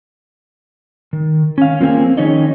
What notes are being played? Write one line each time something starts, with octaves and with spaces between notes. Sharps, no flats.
D#3
C#4 F5
F3 A#3 C4 G#4
D#3 C#4 D#4 C#5 D#5